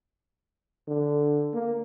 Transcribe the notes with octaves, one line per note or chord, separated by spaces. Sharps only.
D3
A#3